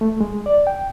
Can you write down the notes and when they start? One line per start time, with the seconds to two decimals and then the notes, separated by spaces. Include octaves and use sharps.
0.01 A3
0.21 G#3
0.46 D5
0.67 G5